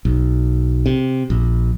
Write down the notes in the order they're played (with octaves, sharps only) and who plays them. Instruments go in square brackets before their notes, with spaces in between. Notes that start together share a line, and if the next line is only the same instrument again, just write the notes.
[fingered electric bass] B1
C3
A#1